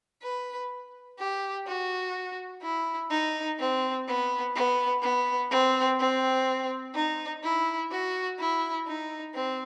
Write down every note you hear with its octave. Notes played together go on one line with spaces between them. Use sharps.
B4
G4
F#4
E4
D#4
C4
B3
B3
B3
C4
C4
D#4
E4
F#4
E4
D#4
C4